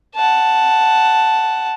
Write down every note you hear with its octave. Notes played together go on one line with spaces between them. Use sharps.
F#5 A5